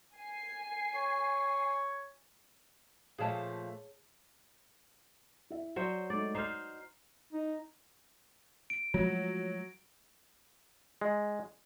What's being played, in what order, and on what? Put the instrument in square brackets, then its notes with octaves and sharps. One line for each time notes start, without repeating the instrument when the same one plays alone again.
[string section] G#5 C7
[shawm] C#5
[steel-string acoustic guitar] A#2 F3 A3 [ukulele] G#4 C#5 A5
[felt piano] E4 E5
[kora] F#3 C5 [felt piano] D5
[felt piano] G#3 A3 D#4 [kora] D5
[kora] D#4 C5 [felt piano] F6 C7
[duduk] D#4
[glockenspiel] D7
[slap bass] F3 G#3 A3 [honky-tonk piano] F#3
[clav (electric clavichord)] G#3